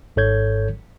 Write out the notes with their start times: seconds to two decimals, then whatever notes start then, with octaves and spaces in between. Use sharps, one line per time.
0.16 G#1 G#2 A4 C#5 G6 G#6